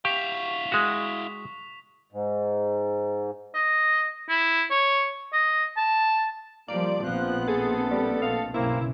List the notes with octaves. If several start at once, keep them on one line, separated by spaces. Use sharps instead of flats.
E4 G4 F5 C#6 B6 F7
G#3 F#4
G#2
D#5
E4
C#5
D#5
A5
F3 G3 A#3 D5
A#1 A#2 F3 B3 C4 F#6
G#4 A4
G3
A3 D#5 F5
B1 G2 C#3 A#3 C4 E4